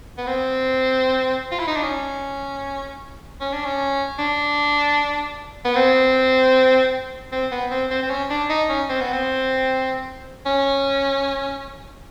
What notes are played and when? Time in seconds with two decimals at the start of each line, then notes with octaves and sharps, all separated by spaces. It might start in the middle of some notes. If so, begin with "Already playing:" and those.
0.18 B3
0.27 C4
1.51 F4
1.59 E4
1.67 D#4
1.76 D4
1.83 C#4
3.41 C#4
3.53 D4
3.65 C#4
4.19 D4
5.65 B3
5.75 C4
7.32 C4
7.51 B3
7.71 C4
7.90 C4
8.02 C4
8.10 C#4
8.30 D4
8.49 D#4
8.69 C#4
8.89 C4
9.01 B3
9.12 C4
10.46 C#4